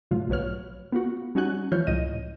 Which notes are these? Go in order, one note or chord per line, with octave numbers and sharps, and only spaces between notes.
G#2 B2 D3 F#3 A3 F4
B1 F#3 B4 C#5 F6
B3 F4 F#4
G3 C#4 D#4 F#4 G#5 F#6
E3 F3 F4 C#5 F6 G6
C#2 A2 D#5 D#7